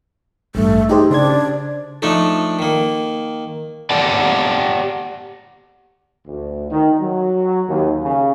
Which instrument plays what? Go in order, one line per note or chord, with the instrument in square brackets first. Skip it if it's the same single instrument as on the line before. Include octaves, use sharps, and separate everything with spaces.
[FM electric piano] A1 G2 [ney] A3
[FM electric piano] D#4 G4 C5 [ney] G#4
[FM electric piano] C#3 C5 G#6 [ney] D4
[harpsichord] F3 A3 D4 D#4 A4
D#3 A#3
[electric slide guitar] G4 D5 F#5 G5 A5
[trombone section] D2
D#3
F#3
D#2
C#3